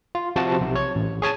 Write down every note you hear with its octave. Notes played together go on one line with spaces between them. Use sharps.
F4
C3 F3 F#4 A5
B1 C3
C#5
A1
G#4 C#5 G#5 A5